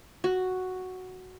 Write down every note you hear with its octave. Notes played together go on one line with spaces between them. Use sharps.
F#4